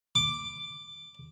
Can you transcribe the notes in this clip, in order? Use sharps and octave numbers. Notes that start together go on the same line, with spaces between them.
D6